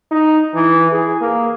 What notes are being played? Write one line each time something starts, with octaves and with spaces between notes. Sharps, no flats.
D#4
E3
G#4
A#3